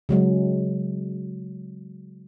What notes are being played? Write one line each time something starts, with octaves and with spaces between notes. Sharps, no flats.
C#3 F#3 G#3